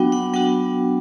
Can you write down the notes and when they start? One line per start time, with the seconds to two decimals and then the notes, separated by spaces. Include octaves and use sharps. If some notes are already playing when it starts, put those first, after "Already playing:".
Already playing: F#3 B3 D4 F#4 G5
0.12 F#5
0.34 F#3 B3 D4 F#4 G5